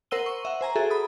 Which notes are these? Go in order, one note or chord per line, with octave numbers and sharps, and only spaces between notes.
A#4 C5 F#5 E6 D#7 G7
C#6 D#7
E5 F#5
C5 G#5 A#5
F#4 G#4 A4 E5
B5 D#6